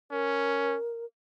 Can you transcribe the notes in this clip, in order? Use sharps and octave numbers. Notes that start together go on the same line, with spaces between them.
C#4 A#4